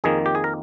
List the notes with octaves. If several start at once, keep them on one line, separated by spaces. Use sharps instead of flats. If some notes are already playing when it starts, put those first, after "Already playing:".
F2 D#3 A#3 G#4
G4
G#4
A#4